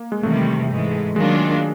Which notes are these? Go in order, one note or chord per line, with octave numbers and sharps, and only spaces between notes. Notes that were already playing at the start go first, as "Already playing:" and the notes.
Already playing: A#3
G#3
E2 C3 D#3 G3 A3
G#2 E3 G#3
D#3 F#3 G#3 A#3 D4 F4